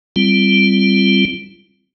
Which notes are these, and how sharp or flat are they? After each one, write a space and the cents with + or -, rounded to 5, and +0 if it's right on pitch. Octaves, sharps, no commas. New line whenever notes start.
G3 +0 C4 +0 F4 -35